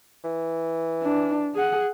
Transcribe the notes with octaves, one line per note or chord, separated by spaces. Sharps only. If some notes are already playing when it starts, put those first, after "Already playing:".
E3
D4
G#4 F#5